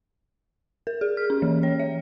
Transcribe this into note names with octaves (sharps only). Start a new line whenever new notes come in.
A#4
G#4
F6
C#4
E3
C#5
E5